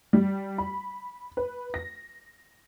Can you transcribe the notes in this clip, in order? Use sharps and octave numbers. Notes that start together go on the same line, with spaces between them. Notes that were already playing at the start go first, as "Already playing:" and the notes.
G3
B5
B4
A#6